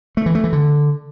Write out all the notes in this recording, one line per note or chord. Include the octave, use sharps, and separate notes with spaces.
A3
E3
A3
E3
D3